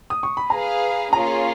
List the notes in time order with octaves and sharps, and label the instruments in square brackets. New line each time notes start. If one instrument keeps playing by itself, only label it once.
[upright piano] D#6
C#6
B5
[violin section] G#4 B4 F5 [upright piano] A#5
[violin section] A#3 C#4 F4 G#4 C#5 [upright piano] A#5